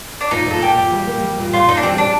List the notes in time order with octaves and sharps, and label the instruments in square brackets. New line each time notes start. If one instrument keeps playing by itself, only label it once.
[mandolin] D4
[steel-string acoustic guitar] A#2 [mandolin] D#4
[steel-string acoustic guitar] A#2 [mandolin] A4
[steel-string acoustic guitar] A#3 [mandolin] G4
[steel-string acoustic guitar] A#2
G3
A#3
G3
A#2
[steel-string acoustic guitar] A#2 [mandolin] F4
[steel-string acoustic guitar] A#2 [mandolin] D#4
[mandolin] D4
[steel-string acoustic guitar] G3 [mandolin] C4
[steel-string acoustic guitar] G3 [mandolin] D4